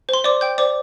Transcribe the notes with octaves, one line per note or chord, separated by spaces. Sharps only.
C5 C6
C5 D5 D6
G5 G6
C5 D5 D6